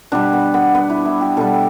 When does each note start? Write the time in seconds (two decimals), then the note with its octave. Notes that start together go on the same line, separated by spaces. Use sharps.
0.12 B2 G3 D4
0.33 B3
0.54 B3
0.75 B3
0.90 E4
1.05 E4
1.21 G4
1.37 B2 G3 A4